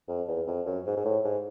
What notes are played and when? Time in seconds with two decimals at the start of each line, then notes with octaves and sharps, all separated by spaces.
0.08 F2
0.28 E2
0.47 F2
0.66 F#2
0.86 G#2
0.96 G#2
1.05 A2
1.24 G#2